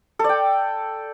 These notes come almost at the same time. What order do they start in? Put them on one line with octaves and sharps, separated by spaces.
A4 D5 G5